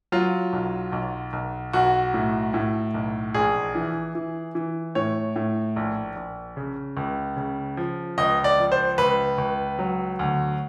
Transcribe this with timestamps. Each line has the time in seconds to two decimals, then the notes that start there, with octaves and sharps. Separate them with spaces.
0.12 F#3 F4
0.53 B1
0.92 B1
1.33 B1
1.73 B1 F#4
2.14 A2
2.54 A2
2.94 B1
3.34 A#1 G#4
3.75 E3
4.15 E3
4.55 E3
4.95 A2 C#5
5.36 A2
5.76 A#1
6.16 A#1
6.57 C#3
6.97 C#2
7.37 C#3
7.77 F3
8.18 C#2 D#5
8.44 D5
8.58 F3
8.72 C5
8.98 C#2 B4
9.38 C#2
9.79 F#3
10.19 D2